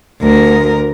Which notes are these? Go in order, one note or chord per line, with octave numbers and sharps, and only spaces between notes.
D2 A#4